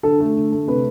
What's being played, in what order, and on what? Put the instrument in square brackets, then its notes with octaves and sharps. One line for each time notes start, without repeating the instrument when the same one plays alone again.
[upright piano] D3 A4
A3
D3
A3
C3 B4